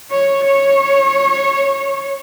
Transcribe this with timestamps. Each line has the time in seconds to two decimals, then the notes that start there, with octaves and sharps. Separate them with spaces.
0.10 C#5
0.46 C#5